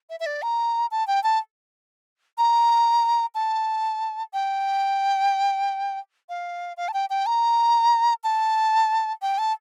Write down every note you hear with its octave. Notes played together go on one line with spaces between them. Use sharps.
E5
E5
D5
A#5
A5
G5
A5
A#5
A5
G5
F5
F5
A5
G5
G5
A#5
A5
G5
A5